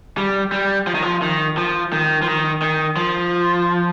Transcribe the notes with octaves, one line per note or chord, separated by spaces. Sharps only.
G3
G3
F3
D#3
F3
D#3
F3
D#3
F3
D#3
D#3
F3